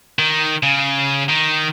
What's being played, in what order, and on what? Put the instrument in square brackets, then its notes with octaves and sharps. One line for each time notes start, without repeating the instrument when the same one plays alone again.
[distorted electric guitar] D#3
C#3
D#3